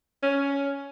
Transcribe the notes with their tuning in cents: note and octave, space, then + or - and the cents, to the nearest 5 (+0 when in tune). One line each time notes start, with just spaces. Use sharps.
C#4 +10